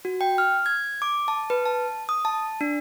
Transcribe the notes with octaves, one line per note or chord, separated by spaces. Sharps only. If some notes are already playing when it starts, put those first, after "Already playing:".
F#4
G5
F6
G#6
D6
A5
B4
A5
D#6
A5
D4